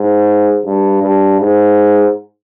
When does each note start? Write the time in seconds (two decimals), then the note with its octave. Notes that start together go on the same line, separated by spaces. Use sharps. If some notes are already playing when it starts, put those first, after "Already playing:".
Already playing: G#2
0.65 G2
1.02 G2
1.40 G#2